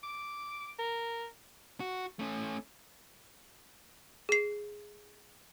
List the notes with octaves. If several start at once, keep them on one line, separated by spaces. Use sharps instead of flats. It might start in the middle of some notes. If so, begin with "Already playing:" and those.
D6
A#4
F#4
A3 C#4
G#4 C7